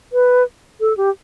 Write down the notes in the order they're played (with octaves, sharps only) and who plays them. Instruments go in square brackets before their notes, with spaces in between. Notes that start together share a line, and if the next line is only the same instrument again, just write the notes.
[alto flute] B4
A4
G4